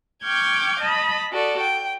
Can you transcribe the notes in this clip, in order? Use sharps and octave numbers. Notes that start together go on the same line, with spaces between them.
G5 C#6 D6 F6 G6 G#6
D#5 A5 B5
F#4 A4 D5
G5